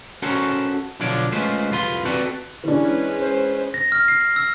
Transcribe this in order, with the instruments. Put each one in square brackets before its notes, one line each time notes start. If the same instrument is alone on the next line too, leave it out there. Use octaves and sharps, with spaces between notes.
[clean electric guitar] C#4 F#4 A4 A#4 C5
B1 D3 F3 D4 C#5 D5
G#3 A3 C#4 F4 B4 C5
C2 F2 F4 B4 C6
C4 F#4 A4 B4 D5
[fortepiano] E3 D4 [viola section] G#3 C#4 B4
[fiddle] C5
[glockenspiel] A#6
F6
C7
E6